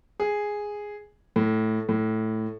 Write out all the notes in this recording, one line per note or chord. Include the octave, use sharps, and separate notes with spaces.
G#4
A2
A2